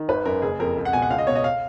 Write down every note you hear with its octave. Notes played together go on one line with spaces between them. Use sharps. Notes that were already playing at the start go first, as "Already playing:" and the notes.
Already playing: D#3
G#1 B4
F#2 A#4
F#1 G#4
F2 A#4
C#2
F#5
B2 G#5
F#5
C#2 F5
D#5
B2 C#5
D#5
F5